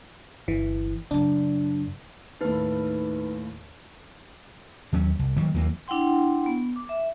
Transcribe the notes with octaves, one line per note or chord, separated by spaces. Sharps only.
G1 E3
F#2 C#3 D4
D#2 A2 D#4 B4
D#2 F#3 C#4
C2
D#3 F#3 G3 A#3
D#2 E3 F#3 A#3
D4 E4 F#5 G5 C6
B3
D6
E5